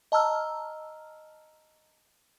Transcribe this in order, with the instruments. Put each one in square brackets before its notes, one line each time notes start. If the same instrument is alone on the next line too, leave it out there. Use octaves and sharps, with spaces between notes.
[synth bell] D#5 A5 A#5 E6 F6